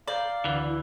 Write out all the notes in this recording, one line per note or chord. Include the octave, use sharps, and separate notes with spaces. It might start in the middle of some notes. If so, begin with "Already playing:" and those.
D5 F5 A#5 G6 A6
D2 E3
E4